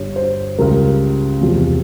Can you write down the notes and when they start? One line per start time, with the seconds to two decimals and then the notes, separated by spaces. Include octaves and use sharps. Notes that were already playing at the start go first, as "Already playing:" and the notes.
Already playing: G1 G2 G3 C#5
0.16 C5
0.59 C#2 C#3 G3 A#4
1.41 E2 C3 F3